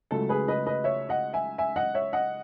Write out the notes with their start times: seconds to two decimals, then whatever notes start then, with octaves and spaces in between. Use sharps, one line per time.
0.11 C#2 C#3 F#3 A3 A4
0.29 G#4 B4
0.48 B4 D#5
0.66 B4 D#5
0.84 C#5 E5
1.09 D#5 F#5
1.33 E5 G#5
1.58 E5 G#5
1.76 D#5 F#5
1.95 C#5 E5
2.13 D#5 F#5